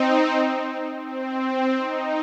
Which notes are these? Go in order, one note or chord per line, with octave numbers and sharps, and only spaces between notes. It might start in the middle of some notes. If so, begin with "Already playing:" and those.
Already playing: C4 D#4
C4
D#4